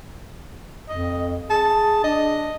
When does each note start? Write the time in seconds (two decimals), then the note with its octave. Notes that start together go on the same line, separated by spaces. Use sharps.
0.89 F2 D#5
1.50 G#4 A5
2.04 D4 D#5